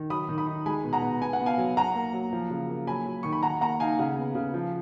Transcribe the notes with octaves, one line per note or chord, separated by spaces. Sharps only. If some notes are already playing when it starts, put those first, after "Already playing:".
Already playing: D#3
F#3 B5 D#6
D#3
B5 D#6
D#4
G#3 G#5 B5
B2
F#5 A#5
B2
B3 G#5
F#5
B3
F5 G#5
F#3
F#3 F#5 A#5
A#3
F#3
F3
C#3
A#3
F#3 G#5 B5
F#3
D#3 C#6
B5
D#3 F#5 A#5
A#3 F#5 A#5
D#4 F5 G#5
C#3 F#5
B3
C#3
F3